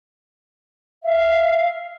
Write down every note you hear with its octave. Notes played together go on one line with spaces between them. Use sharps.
E5 F5